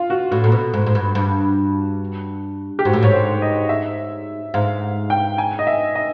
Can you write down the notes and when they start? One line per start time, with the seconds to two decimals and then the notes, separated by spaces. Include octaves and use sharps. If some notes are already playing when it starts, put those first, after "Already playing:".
Already playing: F4
0.10 F#4
0.31 A2 F#4
0.44 A#2
0.52 B2
0.74 G#2
0.86 G#2
0.95 G2
1.15 G2
2.79 G4
2.85 G#2 F#4
2.93 A2
3.03 G#2 C#5
3.13 C5
3.42 D#5
3.69 E5
4.54 G#2 F5
5.10 G5
5.38 G#5
5.59 D#5
5.67 E5
5.95 D#5